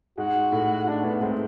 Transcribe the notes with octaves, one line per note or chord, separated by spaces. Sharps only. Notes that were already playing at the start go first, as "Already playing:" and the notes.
G#2 G#3 F#4
A2 A3
D4
A2 A3 B3
G#2 G#3 C4